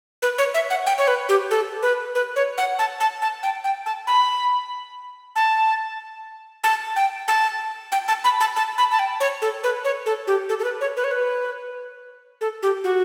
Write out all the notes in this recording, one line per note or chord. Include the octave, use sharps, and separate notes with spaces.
B4
C#5
E5
F#5
G5
C#5
B4
G4
A4
B4
B4
C#5
F#5
A5
A5
A5
G5
G5
A5
B5
A5
A5
G5
A5
G5
A5
B5
A5
A5
B5
A5
G5
C#5
A4
B4
C#5
A4
G4
A4
A4
B4
C#5
B4
C#5
B4
A4
G4
F#4